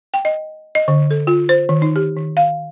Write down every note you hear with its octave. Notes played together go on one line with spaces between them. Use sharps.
G5
D#5
D#5
D3
A4
F4
C5
D#3
D#4
G4
D#3
F5